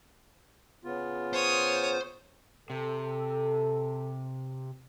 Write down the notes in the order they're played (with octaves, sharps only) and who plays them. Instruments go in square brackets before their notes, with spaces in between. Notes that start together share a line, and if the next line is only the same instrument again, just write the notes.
[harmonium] C#3 B3 F4
[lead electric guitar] C5 [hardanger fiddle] C#5 D#6
[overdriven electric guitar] C3 [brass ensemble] A4